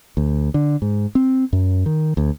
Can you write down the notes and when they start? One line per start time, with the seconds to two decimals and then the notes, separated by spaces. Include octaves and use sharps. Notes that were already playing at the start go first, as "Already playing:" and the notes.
0.17 D2
0.54 D3
0.82 G#2
1.15 C4
1.53 F#2
1.86 D#3
2.17 D2